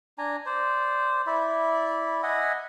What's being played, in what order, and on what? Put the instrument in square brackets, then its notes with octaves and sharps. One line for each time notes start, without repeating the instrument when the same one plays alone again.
[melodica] D4 G#5 A#5
C5 D5
E4 D5 E5
D#5 E5 F#5 G#5